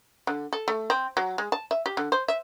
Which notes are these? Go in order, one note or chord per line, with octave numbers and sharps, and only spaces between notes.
D3
A4
A3
C4
F#3
G#3
A5
E5
G4
D3
C5
E5